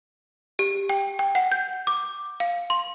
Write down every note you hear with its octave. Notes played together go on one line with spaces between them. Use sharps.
G4
G5
G5
F#5
G6
D6
F5
C6